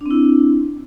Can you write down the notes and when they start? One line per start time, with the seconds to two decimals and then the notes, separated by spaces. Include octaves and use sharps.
0.01 D4
0.06 C4
0.11 E4